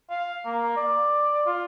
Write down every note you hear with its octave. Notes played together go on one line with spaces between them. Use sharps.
F5
A#3
D5
F4